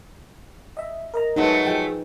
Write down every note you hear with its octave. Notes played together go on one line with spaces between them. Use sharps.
D#5 E5
A#4 D#5 A#5
F#3 G#3 A3 D#4 B4
F3 G#4 G5